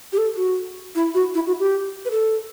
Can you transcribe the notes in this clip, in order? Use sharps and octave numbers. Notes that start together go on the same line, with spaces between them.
G4
A4
F#4
E4
F#4
E4
F#4
G4
B4
A4